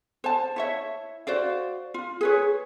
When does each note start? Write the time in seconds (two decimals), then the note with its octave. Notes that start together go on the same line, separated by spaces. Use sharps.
0.24 C5 A5
0.56 E4 C#5 E5
1.27 F#4 C5 D5 F5
1.94 F4
2.21 G#4 B4 C#5